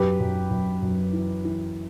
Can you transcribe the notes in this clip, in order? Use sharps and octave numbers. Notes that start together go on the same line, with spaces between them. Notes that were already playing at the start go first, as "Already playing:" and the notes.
Already playing: F#2 G4 B4
F#2
F#2
F#2
E3
E3